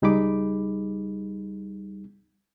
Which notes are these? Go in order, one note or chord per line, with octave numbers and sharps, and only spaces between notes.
C#2 G3 D#4 G#4 B5 D6